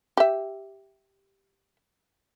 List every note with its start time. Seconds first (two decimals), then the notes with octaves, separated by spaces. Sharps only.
0.17 G4 E5